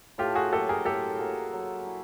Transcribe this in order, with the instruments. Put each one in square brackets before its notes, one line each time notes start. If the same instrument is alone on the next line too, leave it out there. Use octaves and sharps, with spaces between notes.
[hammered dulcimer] A2 [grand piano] F4 G4
[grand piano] F#4 G#4
[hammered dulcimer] F#3 A#3 [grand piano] G4 A4
[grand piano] G#4 A#4
[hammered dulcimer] A2 [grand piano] G4 A4
[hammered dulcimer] F#3 A#3
F#3
E4